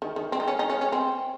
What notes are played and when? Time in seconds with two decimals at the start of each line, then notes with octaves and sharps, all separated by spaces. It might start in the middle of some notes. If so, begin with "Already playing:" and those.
0.02 D#3
0.16 D#3
0.32 C4
0.40 D#4
0.48 C#4
0.59 D#4
0.70 C#4
0.81 C#4
0.92 C4